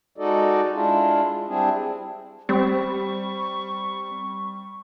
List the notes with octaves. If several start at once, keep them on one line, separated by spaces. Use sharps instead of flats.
G#3 D#4 F#4 A4 D5 D#5
G#3 D4 E4 F4
G3 C4 D4 E4 G#4
G3 C4 C#6